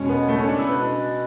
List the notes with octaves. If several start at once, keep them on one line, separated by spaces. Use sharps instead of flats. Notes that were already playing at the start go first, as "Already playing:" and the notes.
Already playing: E2 B2 G#3 C#4
B3
A3
C#4
D4
E4
B2 G#3 D4 B4